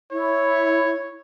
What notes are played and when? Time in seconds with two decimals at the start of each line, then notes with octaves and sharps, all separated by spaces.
0.11 E4 C#5